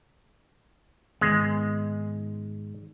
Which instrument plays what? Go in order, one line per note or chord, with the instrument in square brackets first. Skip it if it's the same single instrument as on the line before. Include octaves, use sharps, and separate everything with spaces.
[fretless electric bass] G#2 D#3 B3 [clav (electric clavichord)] G#3